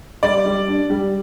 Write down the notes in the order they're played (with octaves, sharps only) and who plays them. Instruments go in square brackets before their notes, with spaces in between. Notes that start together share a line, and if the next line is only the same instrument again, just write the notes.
[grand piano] G3 [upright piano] D5
[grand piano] G3
D4
G3